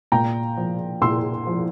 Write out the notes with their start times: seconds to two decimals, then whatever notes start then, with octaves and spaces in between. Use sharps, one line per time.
0.12 A#2 G5 A#5
0.57 F3
1.02 A#2 C6 E6
1.47 F3